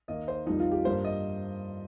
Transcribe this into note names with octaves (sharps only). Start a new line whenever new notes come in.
D#2 D#3 A#3 D#5
C5
F2 D#3 G3 D#4
F4
G4
G2 G3 A#3 C5
D#5